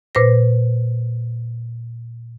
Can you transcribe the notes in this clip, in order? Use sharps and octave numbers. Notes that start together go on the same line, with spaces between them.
A#2 B4 C5 A#6